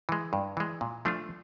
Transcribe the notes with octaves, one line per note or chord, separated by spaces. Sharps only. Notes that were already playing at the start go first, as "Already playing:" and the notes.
E3 G#3
G2
E3 G#3
A#2
F3 A3 D4 F4